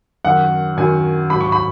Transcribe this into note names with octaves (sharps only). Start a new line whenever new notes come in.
F#2 D#3 F#3 F#5
F#2 D#3 F#3 G#5
G#2 F#3 B5
C#6
B5